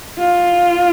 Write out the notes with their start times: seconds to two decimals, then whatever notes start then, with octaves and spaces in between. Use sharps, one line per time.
0.19 F4